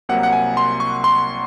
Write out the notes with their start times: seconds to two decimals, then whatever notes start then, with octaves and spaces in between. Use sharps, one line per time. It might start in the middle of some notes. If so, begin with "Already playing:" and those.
0.09 C2 C3 F#3 A#3 F#5
0.23 F#5
0.32 G#5
0.57 C6
0.80 C#6
1.04 C6